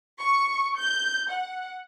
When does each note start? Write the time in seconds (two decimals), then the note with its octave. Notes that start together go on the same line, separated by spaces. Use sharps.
0.20 C#6
0.78 G6
1.31 F#5